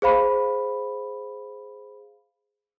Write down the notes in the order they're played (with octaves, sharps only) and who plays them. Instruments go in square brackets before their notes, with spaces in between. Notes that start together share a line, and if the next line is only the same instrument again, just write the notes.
[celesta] G#4 C5 F5 B5